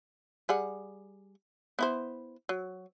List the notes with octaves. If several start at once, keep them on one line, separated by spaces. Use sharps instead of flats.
G3 G#4 F#5
B3 E4 C5
F#3